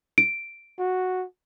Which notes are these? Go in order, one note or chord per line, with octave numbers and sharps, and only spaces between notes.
D7
F#4